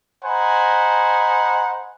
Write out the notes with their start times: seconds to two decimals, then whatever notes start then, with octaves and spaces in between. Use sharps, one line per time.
0.23 C5 D#5 F#5 G#5 A#5 B5